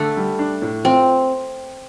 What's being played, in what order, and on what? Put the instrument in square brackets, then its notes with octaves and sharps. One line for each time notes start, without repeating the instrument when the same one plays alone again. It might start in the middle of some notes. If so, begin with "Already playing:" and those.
Already playing: [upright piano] D3 [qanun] A3
[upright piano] G3
D4
A2
[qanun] C4 [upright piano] F4